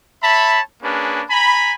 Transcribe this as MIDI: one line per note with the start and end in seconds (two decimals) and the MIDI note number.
0.23 0.60 73
0.23 0.60 76
0.23 0.60 81
0.23 0.60 83
0.83 1.23 58
0.83 1.23 61
0.83 1.23 62
0.83 1.23 68
0.83 1.23 71
1.30 1.75 80
1.30 1.75 82
1.30 1.75 83